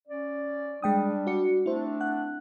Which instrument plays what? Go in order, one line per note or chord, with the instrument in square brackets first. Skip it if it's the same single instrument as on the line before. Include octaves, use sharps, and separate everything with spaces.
[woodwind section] C#4 D5
[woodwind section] G3 D4 [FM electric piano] G#3 G5 D#6
[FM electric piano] F#4 D5 C#7
[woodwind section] A3 C4 D4 [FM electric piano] E4 C5
[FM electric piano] F#5 F#6